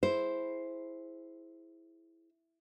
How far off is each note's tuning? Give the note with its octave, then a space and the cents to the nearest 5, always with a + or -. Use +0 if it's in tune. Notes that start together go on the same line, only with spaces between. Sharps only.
E4 +0 G#4 +0 C5 +0